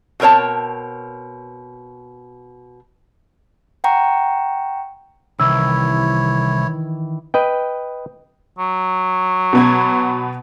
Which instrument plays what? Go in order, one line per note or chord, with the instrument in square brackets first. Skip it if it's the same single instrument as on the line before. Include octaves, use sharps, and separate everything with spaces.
[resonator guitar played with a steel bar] B2 C4 A#4 C#5 A5
[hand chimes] F#5 G5 A#5 C#6
[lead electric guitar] C2 [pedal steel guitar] D#3 E3 [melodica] E4 C#5 [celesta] E6
[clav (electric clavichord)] B4 D#5 G5
[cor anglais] F#3
[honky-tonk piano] B2 B3 G#6